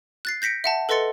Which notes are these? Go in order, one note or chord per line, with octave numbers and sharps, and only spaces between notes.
F#6 A6 C7
G6 A#6 B6 C#7 D7
E5 F#5 A5
A4 B4 D#5 C6 A6 C#7